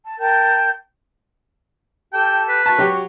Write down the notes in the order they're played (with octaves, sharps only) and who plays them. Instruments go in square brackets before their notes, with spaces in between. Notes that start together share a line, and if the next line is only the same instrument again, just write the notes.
[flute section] A5
A#4 G5 A5 G6
[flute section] G4 A4 A5 [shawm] G5
[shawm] B4
[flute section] F#4 C#6 [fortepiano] A5
[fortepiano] F#3 G4